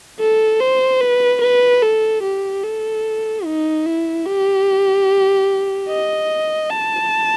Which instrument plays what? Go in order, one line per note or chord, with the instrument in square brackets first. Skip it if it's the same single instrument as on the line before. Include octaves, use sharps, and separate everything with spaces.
[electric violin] A4
C5
B4
B4
A4
G4
A4
D#4
E4
G4
D#5
A5